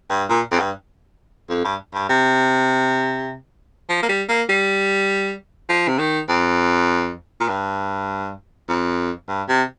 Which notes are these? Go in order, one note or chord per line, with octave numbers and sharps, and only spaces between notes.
G2
A#2
F2
G2
F2
G2
G2
C3
F3
A#3
G3
A#3
G3
F3
C3
D#3
F2
A#2
G2
F2
G2
C3